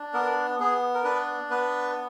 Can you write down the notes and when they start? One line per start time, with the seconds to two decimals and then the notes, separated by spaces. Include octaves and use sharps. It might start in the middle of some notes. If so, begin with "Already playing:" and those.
Already playing: D4
0.14 B3 A#4
0.60 B3 G#4
0.94 A#4
1.04 D4 B4
1.50 B3 B4